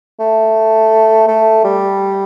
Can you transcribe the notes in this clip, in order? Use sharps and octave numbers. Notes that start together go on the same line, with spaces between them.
A3
A3
G3